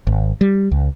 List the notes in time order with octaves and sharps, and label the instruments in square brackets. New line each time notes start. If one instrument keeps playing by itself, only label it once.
[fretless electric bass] G#1
G3
C#2